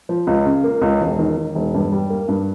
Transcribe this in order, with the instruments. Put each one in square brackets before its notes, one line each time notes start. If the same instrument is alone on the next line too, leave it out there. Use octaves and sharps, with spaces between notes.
[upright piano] F3
C#2
C#3
A#3
C#2
E1
D#3
D#3
E1
G2
G3
A#3
G2